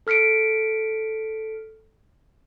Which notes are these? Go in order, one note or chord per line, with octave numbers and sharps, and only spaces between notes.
A4 F6 B6 C#7 D7